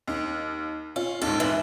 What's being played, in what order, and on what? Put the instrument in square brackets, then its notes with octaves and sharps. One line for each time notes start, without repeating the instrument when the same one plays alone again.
[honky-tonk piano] D#2
[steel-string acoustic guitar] C#4 [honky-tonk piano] F4
[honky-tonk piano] D#2 G#2 [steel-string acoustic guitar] A4
[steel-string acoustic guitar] E3